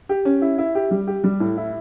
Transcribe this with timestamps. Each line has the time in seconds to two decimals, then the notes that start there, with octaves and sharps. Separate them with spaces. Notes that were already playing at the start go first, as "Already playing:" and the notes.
0.09 G4
0.25 C#4
0.42 E4
0.58 E4
0.75 G4
0.91 G3
1.07 G4
1.24 G3
1.40 A2
1.57 E4